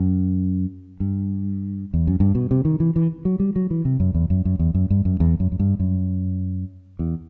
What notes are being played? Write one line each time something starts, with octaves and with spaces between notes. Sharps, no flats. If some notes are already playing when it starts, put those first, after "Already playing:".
Already playing: F#2
G2
E2
F#2
G2
B2
C3
D#3
E3
E3
F#3
G3
F#3
E3
C3
F#2
E2
F#2
F#2
E2
F#2
G2
F#2
E2
F#2
F#2
G2
F#2
E2